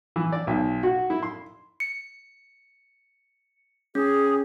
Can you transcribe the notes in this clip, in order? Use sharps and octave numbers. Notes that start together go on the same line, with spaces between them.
E3
D5
B1
F#4
E4
C6
C#7
C#4 G#4